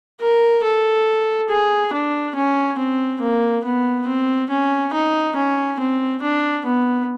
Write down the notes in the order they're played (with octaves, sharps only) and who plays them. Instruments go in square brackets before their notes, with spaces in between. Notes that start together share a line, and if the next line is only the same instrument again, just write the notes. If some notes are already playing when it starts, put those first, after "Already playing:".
[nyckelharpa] A#4
A4
G#4
D4
C#4
C4
A#3
B3
C4
C#4
D#4
C#4
C4
D4
B3